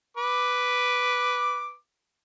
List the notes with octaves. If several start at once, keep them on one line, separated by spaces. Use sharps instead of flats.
B4 D6